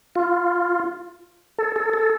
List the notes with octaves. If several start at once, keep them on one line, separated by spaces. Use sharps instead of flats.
F4
A4
A4
A4